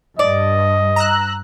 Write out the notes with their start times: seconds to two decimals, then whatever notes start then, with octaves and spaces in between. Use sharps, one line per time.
0.19 G2 D5 D#5
0.96 A#5 E6 F#6